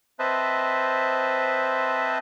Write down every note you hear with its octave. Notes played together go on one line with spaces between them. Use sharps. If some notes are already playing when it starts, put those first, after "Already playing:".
C4 B4 C5 D#5 E5 A5